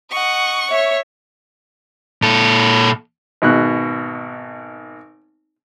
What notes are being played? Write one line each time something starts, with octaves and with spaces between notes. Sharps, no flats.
D#5 F#5 C#6
C#5 E5
A#2 A4
G#1 B2 F#6